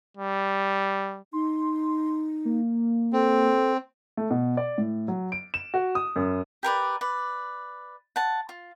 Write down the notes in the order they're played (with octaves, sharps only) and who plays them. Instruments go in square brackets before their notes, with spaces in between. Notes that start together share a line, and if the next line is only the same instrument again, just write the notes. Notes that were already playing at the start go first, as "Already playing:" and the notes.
[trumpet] G3
[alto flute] D#4 [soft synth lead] C6
[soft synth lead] A#3
[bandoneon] C4 [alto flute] A4
[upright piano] A3
B2
D5
A2
F#3
D7
E7
F#4
D#6
F#2
[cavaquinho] G4 A#4 B4 D5
B4 D5
F#5 A5
F4